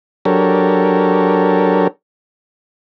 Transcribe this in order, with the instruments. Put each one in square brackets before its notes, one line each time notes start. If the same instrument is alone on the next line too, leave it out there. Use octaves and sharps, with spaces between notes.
[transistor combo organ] F#3 D4 G4 A4 A#4 C#5